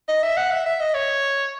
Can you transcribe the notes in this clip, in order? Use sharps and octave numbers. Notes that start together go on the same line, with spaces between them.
D#5
E5
F#5
E5
E5
D#5
C#5